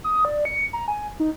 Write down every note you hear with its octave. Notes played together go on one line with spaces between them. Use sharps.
D#6
D5
C#7
A#5
G#5
D#4